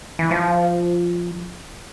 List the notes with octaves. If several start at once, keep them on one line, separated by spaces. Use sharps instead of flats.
E3
F3